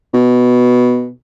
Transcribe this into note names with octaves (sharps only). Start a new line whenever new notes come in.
B2